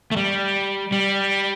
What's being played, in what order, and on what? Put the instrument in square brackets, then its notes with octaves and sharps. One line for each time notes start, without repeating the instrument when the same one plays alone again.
[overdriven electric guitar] A3
G3
G3